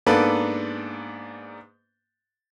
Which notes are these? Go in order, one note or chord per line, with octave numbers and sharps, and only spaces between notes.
G#2 A#3 B3 D4 A4 B4